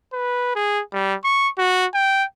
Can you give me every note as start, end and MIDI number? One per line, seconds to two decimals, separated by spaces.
0.13 0.54 71
0.56 0.81 68
0.93 1.15 55
1.24 1.49 85
1.58 1.86 66
1.94 2.24 79